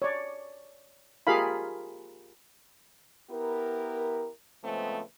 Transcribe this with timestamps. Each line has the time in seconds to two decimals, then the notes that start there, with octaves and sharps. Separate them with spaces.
0.02 C#5 D5
1.27 F4 G4 G#4 A#4 F5 B5
3.30 B3 E4 G4 A#4
4.64 C#3 F3 G#3 A3 B3 C4